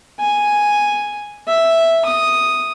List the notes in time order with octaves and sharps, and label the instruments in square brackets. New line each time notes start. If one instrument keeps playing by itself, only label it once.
[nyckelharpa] G#5
E5
D#6